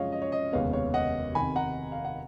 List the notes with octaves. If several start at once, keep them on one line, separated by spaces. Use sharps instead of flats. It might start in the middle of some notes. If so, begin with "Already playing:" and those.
Already playing: F#2 C#3 F3 G#3 C#5 D#5 F5
D#5
C#5
D#5
F1 D#2 C#3 G#3 B3 C#5 F5
C#5 F5
D#5 F#5
F1 F2 D#3 G#5 B5
F#5 A#5
F5
F#5